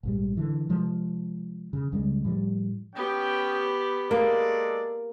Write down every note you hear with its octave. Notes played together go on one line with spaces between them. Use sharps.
A#1 G#2 G3
D3 E3
C3 F3 G#3
C#3
C#2 C#3 G3 G#3
A2 F3 G3
B3 C#4 G4 G5
G#3 A#3 A4 D5